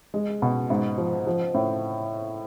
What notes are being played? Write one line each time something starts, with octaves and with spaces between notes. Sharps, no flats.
G#3
B2
G#2
F3
F3
A2